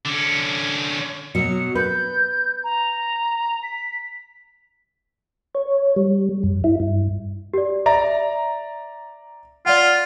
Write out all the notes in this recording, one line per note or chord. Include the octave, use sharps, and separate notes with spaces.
D3 C#4
B2 F#3 C#7
B4 G6
A#5
B6
C#5
G3
F#2
E4
G2
G4 D5
D5 E5 A#5
F4 D5 F5 F#5